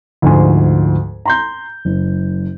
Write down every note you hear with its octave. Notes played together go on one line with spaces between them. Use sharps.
D2 G#2 F3 G#5 C6
A#5 C6 G6
F#1